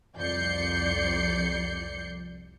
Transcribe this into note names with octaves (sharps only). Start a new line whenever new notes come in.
C2 F2 D5 G6 C7 C#7